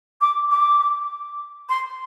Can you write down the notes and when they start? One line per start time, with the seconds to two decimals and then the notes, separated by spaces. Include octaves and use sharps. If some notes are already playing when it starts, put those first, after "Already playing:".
0.21 D6
0.51 D6
1.69 C6